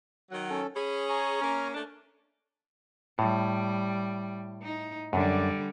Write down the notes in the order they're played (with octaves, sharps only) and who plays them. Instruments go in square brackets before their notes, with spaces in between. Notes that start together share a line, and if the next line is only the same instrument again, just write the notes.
[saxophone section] D#3 F#3 [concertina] F#5
[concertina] C#4 A4
[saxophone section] C#4 G#4 [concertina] B5
[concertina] G#5 A#5 C#6
[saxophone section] A#3 C#4
A3 D4
[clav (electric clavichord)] A2 [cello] G3
[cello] D#4
[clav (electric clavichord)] F#2 [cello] D3 G3